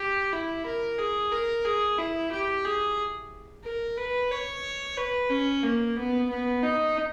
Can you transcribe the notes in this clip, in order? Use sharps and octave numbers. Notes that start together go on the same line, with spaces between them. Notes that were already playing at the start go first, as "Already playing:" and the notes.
Already playing: G4
E4
A#4
G#4
A#4
G#4
E4
G4
G#4
A#4
B4
C#5
B4
C#4
A#3
B3
B3
D#4